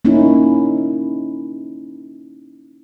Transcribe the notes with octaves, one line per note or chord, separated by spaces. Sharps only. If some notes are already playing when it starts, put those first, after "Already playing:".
A#3 C#4 D#4 E4